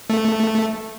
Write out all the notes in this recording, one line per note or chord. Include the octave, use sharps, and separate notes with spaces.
A3